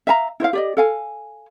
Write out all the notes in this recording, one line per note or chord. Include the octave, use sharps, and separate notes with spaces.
E5 F5 A5 A#5
E4 C5 D#5 F5
G4 D5 D#5
A4 F5 G#5